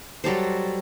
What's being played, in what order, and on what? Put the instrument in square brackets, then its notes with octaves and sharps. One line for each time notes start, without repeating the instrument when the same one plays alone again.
[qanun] F#3 G3 A4 C5